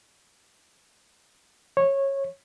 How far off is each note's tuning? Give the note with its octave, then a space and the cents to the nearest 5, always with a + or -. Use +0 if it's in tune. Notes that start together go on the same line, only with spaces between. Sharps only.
C#5 -15